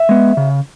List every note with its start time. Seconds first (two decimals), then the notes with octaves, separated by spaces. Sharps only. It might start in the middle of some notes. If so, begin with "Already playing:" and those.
Already playing: E5
0.09 G#3 B3
0.37 C#3